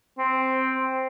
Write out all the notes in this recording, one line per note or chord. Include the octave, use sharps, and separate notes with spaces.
C4